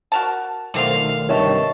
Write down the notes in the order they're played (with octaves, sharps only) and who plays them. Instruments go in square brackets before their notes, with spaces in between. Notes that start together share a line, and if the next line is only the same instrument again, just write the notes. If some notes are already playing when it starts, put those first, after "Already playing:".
[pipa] F#4 A#4 A5
[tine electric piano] B1 D#3 A3 [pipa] D3 C4 F4 [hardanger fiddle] F5
[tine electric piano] G2 C3 D#3 [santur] C#5 D#5 E5 [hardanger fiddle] A5